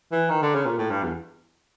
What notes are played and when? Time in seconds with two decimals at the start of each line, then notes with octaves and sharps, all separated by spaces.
0.12 E3
0.30 D#3
0.42 D3
0.55 C#3
0.66 A#2
0.78 A2
0.90 G2
1.03 E2